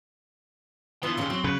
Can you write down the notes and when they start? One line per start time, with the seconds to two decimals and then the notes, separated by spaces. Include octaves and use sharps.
1.03 E3 B3 D4 F4 C6
1.17 D#2 A#2 C#3 C#4
1.30 F#3 C4
1.44 C#3 B4